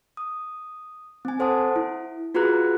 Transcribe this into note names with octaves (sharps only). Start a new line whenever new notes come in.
D#6
C4 G#5
A4 C5 F#5 A5 D#6
E4
F4 F#4 G#4 B4 A#5 F#6